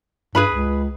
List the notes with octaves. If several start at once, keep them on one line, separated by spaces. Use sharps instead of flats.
G2 G#4 B4 B5
C#2